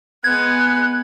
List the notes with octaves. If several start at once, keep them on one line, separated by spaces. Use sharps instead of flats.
G#3 B3 F#6 G#6